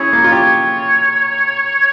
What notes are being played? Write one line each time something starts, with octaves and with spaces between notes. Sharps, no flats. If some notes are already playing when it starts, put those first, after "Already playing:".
Already playing: C#4 E4 G#4 C#5
A#3
F4
G4 C#5